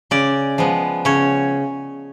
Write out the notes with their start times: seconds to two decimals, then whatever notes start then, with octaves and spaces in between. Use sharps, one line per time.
0.11 C#3 D5
0.58 F3 G#3 B3
1.05 C#3 C#5